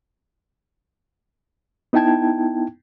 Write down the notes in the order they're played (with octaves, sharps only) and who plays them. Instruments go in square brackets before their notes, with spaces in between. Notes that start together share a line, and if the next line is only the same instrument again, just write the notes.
[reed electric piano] B3 D#4 E4 G5 A5 G#6